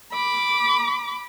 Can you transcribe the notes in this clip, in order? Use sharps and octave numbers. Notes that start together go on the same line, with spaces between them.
B5 D6